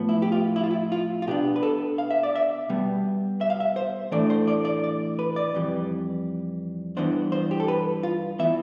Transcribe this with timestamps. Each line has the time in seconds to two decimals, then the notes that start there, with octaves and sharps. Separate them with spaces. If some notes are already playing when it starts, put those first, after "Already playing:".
Already playing: A2 F3 B3
0.09 E4
0.22 G4
0.32 F4
0.56 E4
0.64 F4
0.71 E4
0.92 F4
1.22 F4
1.27 B2 B3 D4 G4
1.56 B4
1.63 A4
1.98 F5
2.11 E5
2.23 D5
2.36 E5
2.69 B2 G3 B3
3.41 E5
3.50 F5
3.60 E5
3.76 C5
4.12 A2 E3 A3 D4 D5
4.30 C5
4.47 D5
4.65 D5
4.84 D5
5.19 B4
5.36 D5
5.54 F2 E3 G3
6.97 G2 E3 B3 D4 C5
7.32 C5
7.51 G4
7.60 A4
7.68 B4
8.03 F4
8.39 E3 B3 E5